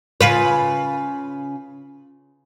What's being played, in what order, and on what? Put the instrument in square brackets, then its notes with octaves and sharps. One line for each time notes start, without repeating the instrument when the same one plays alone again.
[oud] C#3 F4 B4